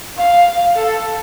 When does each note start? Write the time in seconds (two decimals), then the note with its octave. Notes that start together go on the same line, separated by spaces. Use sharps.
0.16 F5
0.76 A4